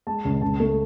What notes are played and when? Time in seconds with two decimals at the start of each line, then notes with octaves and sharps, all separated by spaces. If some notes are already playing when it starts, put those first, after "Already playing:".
0.07 G#3 A5
0.25 C#2
0.41 C#2 A5
0.60 A3